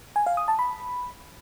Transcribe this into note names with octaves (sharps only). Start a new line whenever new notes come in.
G#5
F5
D#6
A5
B5